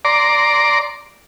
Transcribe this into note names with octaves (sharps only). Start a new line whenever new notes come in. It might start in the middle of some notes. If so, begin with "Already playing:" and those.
D5 A#5 C6 D6